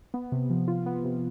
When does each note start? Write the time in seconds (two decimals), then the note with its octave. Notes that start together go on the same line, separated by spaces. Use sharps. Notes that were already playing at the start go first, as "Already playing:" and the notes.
0.14 B3
0.32 C3
0.50 F3
0.68 F4
0.86 B3
1.04 C3